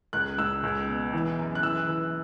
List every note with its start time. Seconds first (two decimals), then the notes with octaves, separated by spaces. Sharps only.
0.13 C#2 F#6
0.38 C#2 E6
0.63 C#2
0.88 B2
1.13 E3
1.39 F#2
1.55 F#6
1.63 E3 E6
1.88 E3